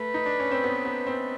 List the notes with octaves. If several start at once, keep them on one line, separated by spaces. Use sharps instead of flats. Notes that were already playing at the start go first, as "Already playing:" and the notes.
Already playing: A3 B4
D#4
D4
C#4
C4
B3
B3
C4